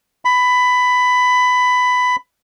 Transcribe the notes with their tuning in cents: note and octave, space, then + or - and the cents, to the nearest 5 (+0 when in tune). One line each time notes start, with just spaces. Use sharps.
B5 +15